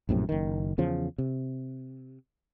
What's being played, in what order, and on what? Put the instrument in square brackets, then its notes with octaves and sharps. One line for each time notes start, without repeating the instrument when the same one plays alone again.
[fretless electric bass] A#1 F#2 A2 C3
F#1 D#3
E2 C#3 F3
C3